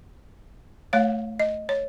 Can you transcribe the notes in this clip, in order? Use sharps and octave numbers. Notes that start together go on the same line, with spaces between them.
A3 C#5 F5
D#5
C#5